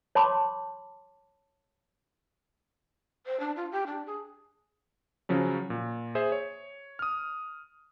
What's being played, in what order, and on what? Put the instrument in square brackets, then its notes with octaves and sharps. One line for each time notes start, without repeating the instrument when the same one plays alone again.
[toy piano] C#5 A5 B5 C6 D6
[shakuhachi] C5
D4
F4
G4
D4
G#4
[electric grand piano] C#3 F3 F#3 C#4
A#2
G#4 C5 E5
C#5
D#6 F6